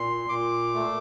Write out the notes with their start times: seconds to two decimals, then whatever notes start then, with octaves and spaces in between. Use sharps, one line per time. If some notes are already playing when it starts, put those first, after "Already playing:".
Already playing: A#2 C6
0.29 A#2 D6
0.75 A3